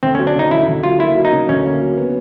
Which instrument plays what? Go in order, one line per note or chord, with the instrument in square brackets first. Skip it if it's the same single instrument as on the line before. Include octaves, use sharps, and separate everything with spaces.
[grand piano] D2 [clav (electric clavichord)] C4
[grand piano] F#3 [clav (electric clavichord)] C#4
[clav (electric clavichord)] D4
[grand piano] C#3 [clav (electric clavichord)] D#4
[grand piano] D2 [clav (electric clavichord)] E4
[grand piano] D2
[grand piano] F#3 [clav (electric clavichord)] F4
[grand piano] A#3 [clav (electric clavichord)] E4
[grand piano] F#3
[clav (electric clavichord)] D#4
[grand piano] C#3
[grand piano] D2 [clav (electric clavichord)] C#4
[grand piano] A#3
F#3
B3